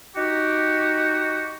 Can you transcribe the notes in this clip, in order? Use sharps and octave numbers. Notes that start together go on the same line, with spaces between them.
D#4 F#4 G4